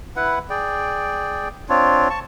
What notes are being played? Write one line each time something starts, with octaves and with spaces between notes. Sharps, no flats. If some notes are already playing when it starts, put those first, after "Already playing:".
E4 B4 F#5
G#4 D5 G5
C4 D4 F4 C#5
A5 C#6